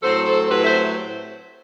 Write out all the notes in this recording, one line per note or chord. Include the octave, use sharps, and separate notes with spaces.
A2 F#3 C4 A4 C5
A4 C5
A2 F#3 C4 G4 B4
C5 E5